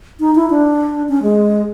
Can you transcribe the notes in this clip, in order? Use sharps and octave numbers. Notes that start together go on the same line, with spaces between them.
D#4
E4
D4
C#4
G#3